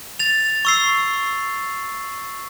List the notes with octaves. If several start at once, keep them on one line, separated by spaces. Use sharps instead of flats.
A6 F7
C#6 E6 C7